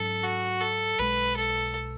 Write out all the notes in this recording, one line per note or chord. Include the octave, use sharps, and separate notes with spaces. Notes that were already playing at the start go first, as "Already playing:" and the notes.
Already playing: G#2 F#3 C#4 A4
F#4
A4
B1 B2 G#3 B4
A4